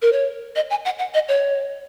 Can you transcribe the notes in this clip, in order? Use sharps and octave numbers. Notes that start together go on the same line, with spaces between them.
A#4
C#5
D#5
G#5
F#5
F#5
D#5
C#5